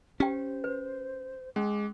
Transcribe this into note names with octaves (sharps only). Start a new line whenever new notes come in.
C#4 G4 C5 G5
B4
G#3 C#4 D6